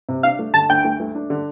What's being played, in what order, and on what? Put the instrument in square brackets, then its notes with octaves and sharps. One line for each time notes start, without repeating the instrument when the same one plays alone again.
[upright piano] C3
[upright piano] D4 [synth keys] F5
[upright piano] A3
[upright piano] D3 [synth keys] A5
[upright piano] D2 [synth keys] G5
[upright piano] A3
A3
D4
D3